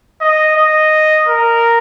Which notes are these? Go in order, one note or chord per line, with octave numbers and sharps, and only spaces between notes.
D#5
D#5
A#4